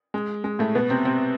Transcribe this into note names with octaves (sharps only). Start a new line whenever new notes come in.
G#3
G#3
A2 A3
B2 B3
C3 C4
C3 C4